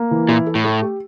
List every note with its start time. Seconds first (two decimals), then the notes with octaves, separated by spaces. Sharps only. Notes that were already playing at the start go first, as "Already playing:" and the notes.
Already playing: A#3
0.11 E3
0.29 A#2 E4
0.47 A4
0.55 A2
0.64 A3
0.82 G4